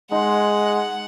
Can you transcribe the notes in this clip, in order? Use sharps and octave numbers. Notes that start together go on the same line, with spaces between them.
G#3 D#4 F#5 C6